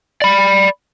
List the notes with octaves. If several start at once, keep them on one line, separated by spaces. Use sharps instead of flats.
D5 B5